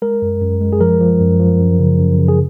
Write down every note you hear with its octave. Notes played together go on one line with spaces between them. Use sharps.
G#3 A#4
F#2
F#2
G#3
G#4
F3 A#4
F3
F#2
F3
F#2
C#3
F#2
C#3
G#4